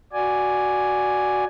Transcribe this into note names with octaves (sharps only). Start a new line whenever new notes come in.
F#4 D5 G#5